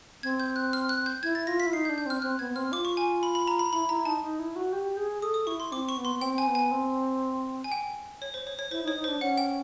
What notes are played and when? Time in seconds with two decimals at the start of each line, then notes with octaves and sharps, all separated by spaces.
0.23 C4 G#6
0.40 G6
0.56 F#6
0.73 F6
0.89 F#6
1.06 G6
1.23 E4 G#6
1.35 A6
1.47 F4 A#6
1.60 B6
1.67 E4
1.73 D#4 C7
1.85 G6
1.89 D4
1.98 G6
2.06 C4 F6
2.22 C4 F#6
2.39 B3 G#6
2.50 B3
2.56 C4 F6
2.72 F4 D6
2.85 C#6
2.97 G#5
3.23 B5
3.35 B5
3.47 A#5
3.59 B5
3.72 E4 B5
3.89 E4 A#5
4.05 D#4 A5
4.22 D#4
4.39 E4
4.56 F#4
4.73 G4
4.97 G#4
5.22 A4 D#6
5.34 D#6
5.47 E4 C#6
5.60 C6
5.72 C4 D6
5.89 C#6
5.97 B3
6.05 C6
6.15 B3
6.21 C4 G5
6.38 G#5
6.47 B3
6.55 G#5
6.71 C4
7.64 G#5
7.72 G5
8.22 C#5
8.34 C5
8.47 C#5
8.59 C#5
8.71 E4 C5
8.83 D#4
8.88 C#5
8.96 D#4
9.04 D4 C5
9.21 C#4 F#5
9.38 G5